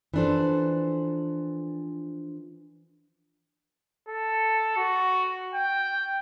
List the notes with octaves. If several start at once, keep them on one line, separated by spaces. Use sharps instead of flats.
E3 F3 D4 A4 C5
A4
F#4
G5